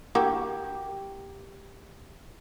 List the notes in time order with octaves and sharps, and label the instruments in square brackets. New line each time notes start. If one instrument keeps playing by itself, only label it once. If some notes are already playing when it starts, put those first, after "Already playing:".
[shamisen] A#3 E4 F#4 [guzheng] G4